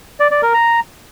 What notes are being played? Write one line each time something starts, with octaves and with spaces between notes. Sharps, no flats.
D5
D5
A#4
A#5